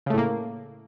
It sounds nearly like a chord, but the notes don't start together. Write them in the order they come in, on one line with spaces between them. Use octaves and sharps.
C#3 A3 A2 A#3